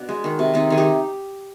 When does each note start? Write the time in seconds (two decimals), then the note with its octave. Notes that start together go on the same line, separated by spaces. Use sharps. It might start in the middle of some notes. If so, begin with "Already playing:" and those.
Already playing: B2 D4
0.09 G#3
0.24 D#3
0.39 C3
0.54 D#3 C4 D#4
0.70 D#3 G#4
0.77 D#4 G4